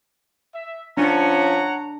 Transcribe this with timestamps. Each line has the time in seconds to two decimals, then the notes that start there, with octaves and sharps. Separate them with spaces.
0.53 E5
0.97 F3 C#4 D4 C#5 F#5 A#5